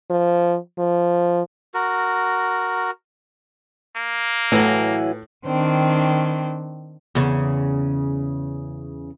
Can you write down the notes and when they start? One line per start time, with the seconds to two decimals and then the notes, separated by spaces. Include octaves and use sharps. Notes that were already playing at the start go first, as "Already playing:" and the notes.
0.10 F3
0.79 F3
1.74 F#4 A#4
3.97 A#3
4.52 A2 E3 F#3
5.45 D#3 C4 D4
7.15 E2 C#3